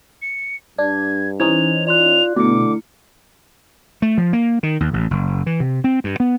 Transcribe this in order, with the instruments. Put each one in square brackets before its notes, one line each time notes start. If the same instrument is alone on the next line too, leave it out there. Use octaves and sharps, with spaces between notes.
[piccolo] C#7
[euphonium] G2 [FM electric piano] D4 [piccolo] G#6
[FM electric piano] E3 C#4 D#4 [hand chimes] C5 G#6 [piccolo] F7
[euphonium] F4 [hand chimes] D5 C6 F#6 [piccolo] F7
[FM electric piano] B2 [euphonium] D3 [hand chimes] A3 E4 C#7 [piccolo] D6
[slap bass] A3
F3
A#3
D#3
D#2
A1
F#1
E3
C3
C4
G2
B3